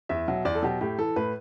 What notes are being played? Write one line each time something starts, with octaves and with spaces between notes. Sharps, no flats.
E2 E5
B2 F#3
E2 D5
A4
B2 F#3 G4
A2 G4
E3 A4
A2 B4